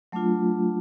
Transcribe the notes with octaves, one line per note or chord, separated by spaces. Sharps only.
F#3 A3 D4 F4